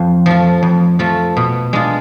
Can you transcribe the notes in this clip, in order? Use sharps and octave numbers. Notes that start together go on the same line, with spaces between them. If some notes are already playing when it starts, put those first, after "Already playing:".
Already playing: F2
F3 A3 F4
F2
F3 A3 F4
B2
G#3 D4 F4